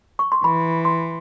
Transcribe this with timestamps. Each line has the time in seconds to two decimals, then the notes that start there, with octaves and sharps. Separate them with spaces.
0.19 C#6
0.32 C6
0.44 E3 B5
0.85 C6